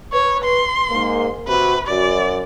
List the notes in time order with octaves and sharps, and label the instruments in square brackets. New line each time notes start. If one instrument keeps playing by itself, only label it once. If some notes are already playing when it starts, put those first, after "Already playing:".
[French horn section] B4 [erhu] C#5
[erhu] C6
[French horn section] G#2 A#3
[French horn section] C3 F#4 [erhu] B4
[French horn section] F#2 F#4 [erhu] D5